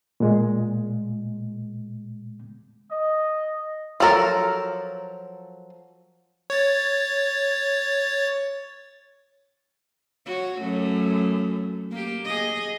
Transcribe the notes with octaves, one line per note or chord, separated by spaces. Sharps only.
A#2 G#3
D#5
F3 F#3 A4 A#4
C#5 A6
F#4 C#5
F#2 A3
A#3 G4
G#4 D#5